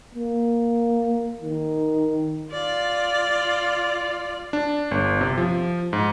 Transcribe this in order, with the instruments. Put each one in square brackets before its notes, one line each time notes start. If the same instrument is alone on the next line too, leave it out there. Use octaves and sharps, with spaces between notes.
[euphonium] A#3
D#3
[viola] F4 D5
[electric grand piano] D4
G1
C3
F3
G#2